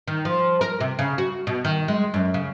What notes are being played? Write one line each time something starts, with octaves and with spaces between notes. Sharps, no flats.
D#3
F3
A#4
C3
C#3
F#4
B2
D#3
G#3
F#2
C#3